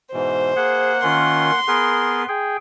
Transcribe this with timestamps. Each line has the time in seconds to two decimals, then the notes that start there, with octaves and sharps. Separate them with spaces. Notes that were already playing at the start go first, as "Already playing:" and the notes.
0.13 G#2 B2 E3 C5
0.56 A#3 G#4 F#5
1.03 D#3 C#4 F4 C6
1.68 B3 G#4 A#4 B4
2.28 G#4 G5